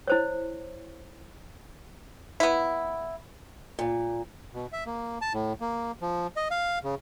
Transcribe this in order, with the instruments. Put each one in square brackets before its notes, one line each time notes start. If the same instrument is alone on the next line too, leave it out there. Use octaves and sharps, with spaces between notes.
[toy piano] E4 C5 C#5
[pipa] B3 E4
[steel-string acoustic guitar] A#2
[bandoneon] B2
E5
A#3
A5
A2
A#3
F3
D#5
F5
C#3